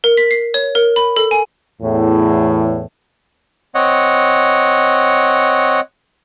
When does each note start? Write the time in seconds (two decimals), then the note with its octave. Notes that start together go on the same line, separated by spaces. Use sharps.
0.04 A#4
0.17 B6
0.31 C7
0.54 C#5
0.75 A#4
0.96 B5
1.16 A4
1.31 G#5
1.82 E2 A2
3.75 C4 C#5 D#5 F#5